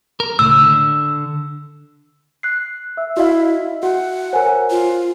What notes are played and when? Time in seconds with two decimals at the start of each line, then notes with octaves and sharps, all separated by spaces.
0.20 A#4
0.39 C#2 A2 E6
0.61 D3
2.43 F#6 C7
2.97 E5 E6
3.17 E4 F#4 D#5 F5
3.83 F#4 F#5
4.33 A#4 C5 C#5 G#5
4.70 F4